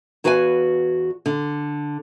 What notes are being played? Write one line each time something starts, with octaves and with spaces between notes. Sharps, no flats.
E2 F#4 B4 F5 F#5 G#5
D3